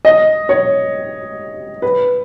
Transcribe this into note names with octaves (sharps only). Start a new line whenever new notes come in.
D#5
C#5
B4